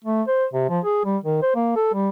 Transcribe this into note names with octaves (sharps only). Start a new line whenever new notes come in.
A3
C5
C3
F3
G#4
G3
D#3
C5
A#3
A4
G3